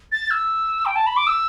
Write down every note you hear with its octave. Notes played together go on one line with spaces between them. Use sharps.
A6
E6
G5
A5
B5
D6
E6